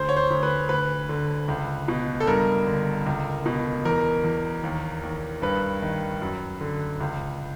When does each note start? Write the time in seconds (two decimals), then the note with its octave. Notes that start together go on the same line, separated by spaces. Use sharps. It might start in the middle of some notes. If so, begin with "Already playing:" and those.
Already playing: D2 C5
0.09 C#5
0.16 C5
0.30 D2
0.43 B4
0.69 D2 B4
1.09 D3
1.48 C#2
1.88 B2
2.20 A4
2.27 G2 A#4
2.67 D3
3.06 C#2
3.46 B2
3.85 E2 A#4
4.24 E2
4.64 D#2
5.03 D#2
5.42 G2 B4
5.82 D#3
6.22 F#2
6.61 D3
7.00 C#2